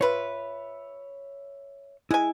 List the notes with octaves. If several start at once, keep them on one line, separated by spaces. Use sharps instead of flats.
F4 B4 C#5 E5
G#3 E4 G#5